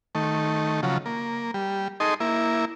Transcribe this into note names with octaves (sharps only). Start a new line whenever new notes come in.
D#3 A3
C#3 F3 F#3
A#3
G3
D#4 G#4 A4 D#5 C6
A#3 E4